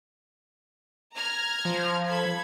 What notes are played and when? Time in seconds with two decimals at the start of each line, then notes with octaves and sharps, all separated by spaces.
1.14 A#5 F6 G#6
1.65 F3
2.09 A4 B5 G#6